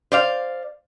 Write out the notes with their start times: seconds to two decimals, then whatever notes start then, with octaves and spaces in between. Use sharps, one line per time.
0.12 C5 D5 F5